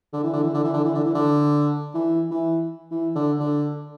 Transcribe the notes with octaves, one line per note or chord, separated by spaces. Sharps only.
D3
E3
D3
E3
D3
E3
D3
E3
D3
E3
D3
E3
E3
E3
D3
D3